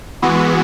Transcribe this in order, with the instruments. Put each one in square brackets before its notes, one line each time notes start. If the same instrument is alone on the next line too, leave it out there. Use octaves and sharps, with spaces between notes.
[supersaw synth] E3 G#3 B3 F#4